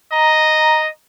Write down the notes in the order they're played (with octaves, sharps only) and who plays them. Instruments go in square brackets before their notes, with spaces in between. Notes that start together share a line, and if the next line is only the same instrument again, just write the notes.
[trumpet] D#5 [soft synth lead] A#5